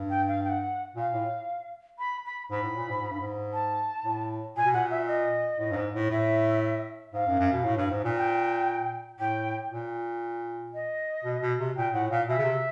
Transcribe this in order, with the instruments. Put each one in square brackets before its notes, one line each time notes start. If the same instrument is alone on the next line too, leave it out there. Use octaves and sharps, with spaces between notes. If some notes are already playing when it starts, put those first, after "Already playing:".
Already playing: [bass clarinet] G2
[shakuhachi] G5
F5
G5
F#5
[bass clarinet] A#2 [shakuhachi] F5
[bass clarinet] A2
[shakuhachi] B5
B5
[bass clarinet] G#2 [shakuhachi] B5
[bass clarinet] A2
A#2
G#2
G#2
G2
G#2
[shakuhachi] A5
[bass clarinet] A2
[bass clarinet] A#2 [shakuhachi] G#5
[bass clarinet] B2
[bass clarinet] A#2 [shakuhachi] F#5
[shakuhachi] E5
D#5
[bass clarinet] A2
G2
G#2
A2
[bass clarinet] A2 [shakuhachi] E5
[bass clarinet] G#2 [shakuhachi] F5
[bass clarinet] F#2
F#2
B2
A2
G2
G#2
A#2
[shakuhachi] G5
[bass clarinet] A2 [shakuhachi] G5
[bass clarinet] A#2
[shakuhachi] D#5
[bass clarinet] B2
B2
C3
[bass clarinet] A#2 [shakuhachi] G5
[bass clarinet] A2 [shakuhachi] F#5
[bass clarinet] A#2 [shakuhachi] F5
[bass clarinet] B2 [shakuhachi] E5
[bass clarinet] C#3
C3